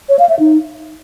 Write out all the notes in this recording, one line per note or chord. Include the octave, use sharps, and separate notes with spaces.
C#5
F5
E5
D#4